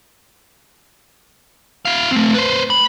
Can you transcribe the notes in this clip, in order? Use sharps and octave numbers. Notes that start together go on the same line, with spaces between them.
E4 F5
A3 C4
B4 C5
B5